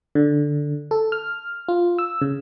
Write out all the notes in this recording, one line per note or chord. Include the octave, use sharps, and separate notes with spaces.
D3
A4
F6
F4
E6
C#3